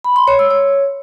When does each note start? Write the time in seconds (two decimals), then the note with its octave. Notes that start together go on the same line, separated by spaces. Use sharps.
0.04 B5
0.16 C6
0.28 C#5
0.39 E6
0.51 C#5